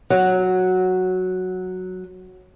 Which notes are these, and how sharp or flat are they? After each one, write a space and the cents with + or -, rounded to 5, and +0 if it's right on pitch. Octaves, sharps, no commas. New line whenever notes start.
F#3 -5